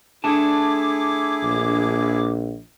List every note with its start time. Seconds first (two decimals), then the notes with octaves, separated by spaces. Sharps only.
0.24 A3 D4 E4 G#4 A5 D6
1.43 A#1